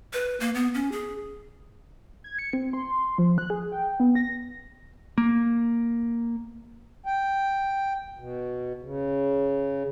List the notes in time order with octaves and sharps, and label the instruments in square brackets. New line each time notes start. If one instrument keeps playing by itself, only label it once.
[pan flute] B4
A#3
B3
C#4
G#4
[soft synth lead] G#6
C#7
C4
C6
F3
F#6
G#4
G5
B3
A#6
[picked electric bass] A#3
[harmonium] G5
B2
C#3